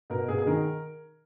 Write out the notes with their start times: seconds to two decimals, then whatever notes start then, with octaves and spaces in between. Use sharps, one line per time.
0.10 B2 A#4
0.28 B2 G#4
0.38 G#4
0.46 D#3 A#4